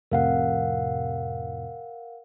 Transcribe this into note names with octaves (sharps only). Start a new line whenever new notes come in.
F2 A2 C3 A#4 F5 F#5